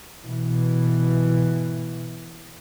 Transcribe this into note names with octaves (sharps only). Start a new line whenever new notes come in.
B2 E3